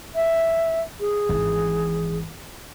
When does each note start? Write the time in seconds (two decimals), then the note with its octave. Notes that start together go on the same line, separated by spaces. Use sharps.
0.15 E5
1.00 G#4
1.29 G#1 E3